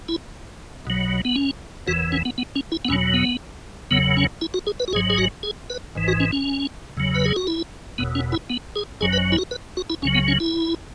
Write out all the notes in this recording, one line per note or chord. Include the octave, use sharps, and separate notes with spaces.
E4
B1 B2 F#3
B3
C#4
F#1 E2 E3 F#4
C#4
B3
B3
C#4
E4
B3
E2 B2 F#3 C#4
B3
F#1 E2 C#3 F#3 B3
C#4
E4
F#4
G#4
B4
F#4
G#1 G#2 F#3 G#4
G#4
F#4
G#4
B4
G#1 G#2 E3
F#4
C#4
C#4
E2 C#3 F#3
B4
G#4
F#4
E4
F#1 E2 B2 B3
C#4
E4
B3
G#4
G#1 F#2 F#3 G#4
B4
E4
F#4
B4
F#4
E4
C#2 C#3 F#3 C#4
B3
C#4
E4